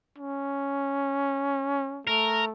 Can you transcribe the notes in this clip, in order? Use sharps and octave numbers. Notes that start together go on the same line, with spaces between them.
C#4
A3 A#4